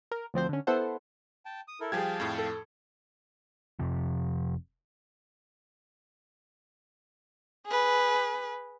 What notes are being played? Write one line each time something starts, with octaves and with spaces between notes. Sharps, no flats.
A#4
D2 F3 C4 C5
D3 C#4
B3 E4 A4 C5 F#5
G5 A5
D#6
E4 A4 A#4
F3 G3 G4 G#4 F5 G5 A5 G#6
F2 A2
A4
F1 F2 C3 F3
G#4 B4